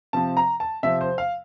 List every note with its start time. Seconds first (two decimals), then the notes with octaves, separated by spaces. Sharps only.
0.13 C3 F3 C4 A5
0.37 A#5
0.60 A5
0.83 C3 F3 C4 E5
1.01 C5
1.18 F5